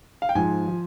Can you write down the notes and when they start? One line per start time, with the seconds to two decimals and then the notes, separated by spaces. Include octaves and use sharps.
0.22 F5
0.29 G5
0.35 G#2 F3 G#5
0.68 F3